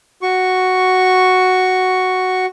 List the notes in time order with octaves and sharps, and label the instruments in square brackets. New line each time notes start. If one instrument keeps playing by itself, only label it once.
[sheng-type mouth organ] F#4 C#6